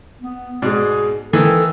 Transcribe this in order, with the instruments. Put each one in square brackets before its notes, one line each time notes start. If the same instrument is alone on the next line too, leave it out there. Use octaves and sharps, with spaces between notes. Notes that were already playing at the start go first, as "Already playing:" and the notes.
[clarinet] B3
[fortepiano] G#2 B2 D5 [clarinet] G#4
[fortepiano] D#3 E3 [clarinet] A4